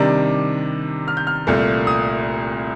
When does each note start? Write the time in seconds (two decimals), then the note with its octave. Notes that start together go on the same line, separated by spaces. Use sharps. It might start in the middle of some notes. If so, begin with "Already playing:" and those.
Already playing: C3 D#3 G3 D4 D6
1.08 F6
1.17 G6
1.27 F6
1.47 C2 A#2 A3
1.87 D#6